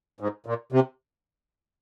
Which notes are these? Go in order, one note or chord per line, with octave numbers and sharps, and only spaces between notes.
G#2
A#2
C3